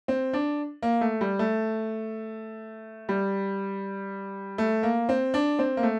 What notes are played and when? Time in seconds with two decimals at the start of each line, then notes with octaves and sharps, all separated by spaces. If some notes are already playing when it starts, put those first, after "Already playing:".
0.08 C4
0.33 D4
0.82 A#3
1.01 A3
1.21 G3
1.39 A3
3.09 G3
4.58 A3
4.83 A#3
5.09 C4
5.34 D4
5.59 C4
5.77 A#3
5.83 A3